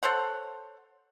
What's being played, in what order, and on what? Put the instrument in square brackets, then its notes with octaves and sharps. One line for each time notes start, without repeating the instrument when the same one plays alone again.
[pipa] A4 C5 C#5 F#5